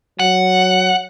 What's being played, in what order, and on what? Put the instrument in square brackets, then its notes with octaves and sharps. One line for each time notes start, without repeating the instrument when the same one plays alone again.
[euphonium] F#3 [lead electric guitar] F#5